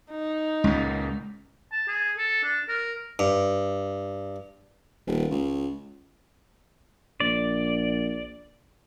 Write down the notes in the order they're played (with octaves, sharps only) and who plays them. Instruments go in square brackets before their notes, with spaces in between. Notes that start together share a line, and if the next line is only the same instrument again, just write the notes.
[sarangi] D#4
[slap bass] C#2 A#2 [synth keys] G#3 C#4 F#5
[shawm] A5
G#4
A4
D4
A#4
[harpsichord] G2
[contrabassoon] D#1
C#2
[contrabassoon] A#1 [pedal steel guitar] D5